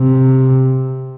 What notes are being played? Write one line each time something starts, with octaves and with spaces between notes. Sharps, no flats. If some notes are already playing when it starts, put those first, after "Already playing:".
Already playing: C3